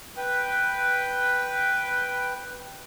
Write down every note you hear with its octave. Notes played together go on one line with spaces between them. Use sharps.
B4 G5